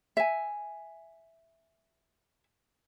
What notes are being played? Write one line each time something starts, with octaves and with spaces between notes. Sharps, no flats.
E5 G#5